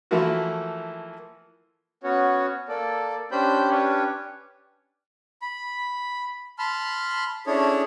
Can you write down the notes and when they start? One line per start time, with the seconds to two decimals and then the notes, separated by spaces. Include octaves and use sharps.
0.11 E3 F3 A3 A#3 E4 F#4
2.03 B3 C#4 F#4 C#5
2.68 A#3 A4 D5
3.31 C#4 D4 G4 C5 B5 G6
3.70 C#4 D4 G4 B4 C#5
5.42 B5
6.58 A5 B5 C6 F6
7.47 C#4 D4 E4 G#4 A4 C#5